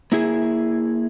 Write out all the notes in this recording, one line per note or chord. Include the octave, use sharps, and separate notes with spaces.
A#3 E4 G#4